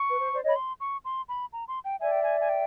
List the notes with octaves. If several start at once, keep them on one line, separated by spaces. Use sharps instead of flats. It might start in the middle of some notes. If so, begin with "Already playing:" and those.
Already playing: C#6
B4
C5
C5 D5
C#5 D#5
B5
C6
C#6
C6
B5
A#5
C6
G5
D5 E5 G#5
G5
G#5
G#5
G5